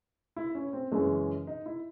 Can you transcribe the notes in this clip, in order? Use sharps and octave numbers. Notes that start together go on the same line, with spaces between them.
E4
C#4
C4
F#2 C#3 E3 G#3 C#4
D#4
E4